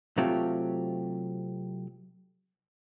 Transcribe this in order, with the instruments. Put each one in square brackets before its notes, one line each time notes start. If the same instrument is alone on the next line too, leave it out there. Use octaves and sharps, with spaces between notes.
[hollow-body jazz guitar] C3 F#3 A3 C4 F4 G4